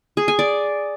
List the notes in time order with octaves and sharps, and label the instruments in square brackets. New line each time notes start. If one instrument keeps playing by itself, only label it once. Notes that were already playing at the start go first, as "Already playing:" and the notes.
[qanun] G#4
G#5
D5